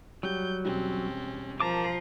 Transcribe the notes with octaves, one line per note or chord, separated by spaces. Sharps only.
F#3 G3 G4 G6
E1 G3 C4 C#4
F3 A#4 A5 A#5 D6